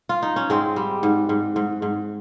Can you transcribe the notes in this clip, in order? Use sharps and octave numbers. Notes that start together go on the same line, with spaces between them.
F4
D#4
C#4
G#2 G#3 C4
G3
G#2
G#2
G#2
G#2